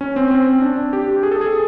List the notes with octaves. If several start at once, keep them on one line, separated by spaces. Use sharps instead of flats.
C#4
C4
C4
D4
G4
G4
G#4
A4
G#4